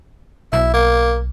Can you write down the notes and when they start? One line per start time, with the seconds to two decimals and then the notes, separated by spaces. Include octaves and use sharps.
0.53 B1 E4
0.74 A#3